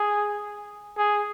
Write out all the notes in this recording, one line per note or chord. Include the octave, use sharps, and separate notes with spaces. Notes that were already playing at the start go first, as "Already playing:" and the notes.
Already playing: G#4
G#4